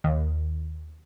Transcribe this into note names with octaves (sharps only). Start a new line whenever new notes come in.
D#2